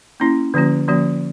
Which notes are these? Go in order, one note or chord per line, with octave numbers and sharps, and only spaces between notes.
A#3 C#4 E4
D3 F3 A#3 C#4 F#4
D3 F3 A#3 C#4 F#4